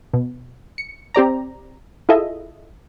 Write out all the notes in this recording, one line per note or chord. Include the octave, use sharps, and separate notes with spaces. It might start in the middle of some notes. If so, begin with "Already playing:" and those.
B2
C#7
C4 G4 D5 A#5
E4 F4 G#4 A4 D#5 E5